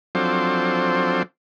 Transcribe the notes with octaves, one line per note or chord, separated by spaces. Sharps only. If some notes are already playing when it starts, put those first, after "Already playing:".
F3 F#3 C4 D4 A4 C5